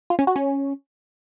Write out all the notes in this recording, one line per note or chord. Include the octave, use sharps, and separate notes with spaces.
F4
C#4
F#4
C#4